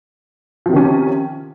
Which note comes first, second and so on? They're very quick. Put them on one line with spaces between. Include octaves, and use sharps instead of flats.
F3 C3 D#3 C#4